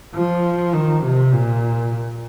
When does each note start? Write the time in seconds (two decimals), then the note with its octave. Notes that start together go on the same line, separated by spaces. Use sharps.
0.15 F3
0.73 D#3
1.03 C3
1.33 A#2